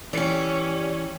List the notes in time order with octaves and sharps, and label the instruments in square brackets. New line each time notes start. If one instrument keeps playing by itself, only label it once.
[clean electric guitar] E3 [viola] C#4 [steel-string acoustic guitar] G4 D5